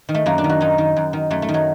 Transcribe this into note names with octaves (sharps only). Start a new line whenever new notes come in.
D#3
A3
F#2 A#3
D4
D#3
F#4
F#2 D#4
D#3
F#2
D#3
F#2 A3
A3
D#3
F#3